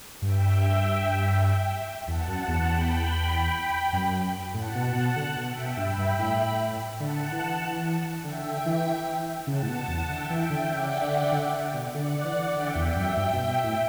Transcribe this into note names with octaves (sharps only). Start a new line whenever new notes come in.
G2 E5 G5
E2 F#5 A5
F#2
E2
G5 B5
F#2
A2 F#5 A5
B2
B2
D3 F#5 A5
B2
E5 G5
B2
G2 G5 B5
G2
A2
D3 F#5 A5
E3
D3 E5 G5
D3
E3
C#3 F#5 A5
A2
B2
E2
D3 E5 G5
E3
D3
C#3 D5 F#5
D3
D3
D3
B2
D3 D5 F#5
E3
D3 E5 G5
E2
F#2
G2
B2
B2
A2